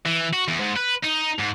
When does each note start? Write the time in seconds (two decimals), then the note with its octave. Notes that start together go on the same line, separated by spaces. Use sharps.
0.06 E3
0.33 F#4
0.48 E2
0.60 G#2
0.76 B4
1.03 D#4
1.39 G#2